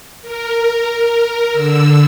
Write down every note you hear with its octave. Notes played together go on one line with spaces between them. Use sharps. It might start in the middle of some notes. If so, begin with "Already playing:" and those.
A#4
D3 E6